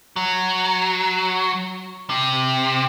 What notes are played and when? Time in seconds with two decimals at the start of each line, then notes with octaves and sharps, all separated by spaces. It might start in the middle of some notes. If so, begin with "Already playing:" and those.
0.16 F#3
2.10 C3